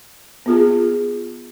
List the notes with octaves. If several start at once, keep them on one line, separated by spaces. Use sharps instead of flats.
B3 F4 G#4